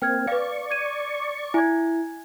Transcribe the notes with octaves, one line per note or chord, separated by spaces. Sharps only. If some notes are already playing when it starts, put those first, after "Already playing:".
A#3 C4 G5 F6 G#6
B4 D5 F5 C#6
G#6 D#7
E4 G#5 G#6